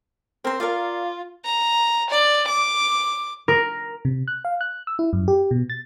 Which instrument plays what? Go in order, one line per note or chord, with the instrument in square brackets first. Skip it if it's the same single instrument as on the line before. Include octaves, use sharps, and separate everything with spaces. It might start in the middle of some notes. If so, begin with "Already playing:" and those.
[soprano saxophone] C4 [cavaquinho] A#4 C5
[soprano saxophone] F4 [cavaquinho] A#4 D5 F5
[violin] A#5
D5
D6
[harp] A#4
[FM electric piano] C3
F#6
F5
F#6
E6
E4
F#2
G4
B2
A6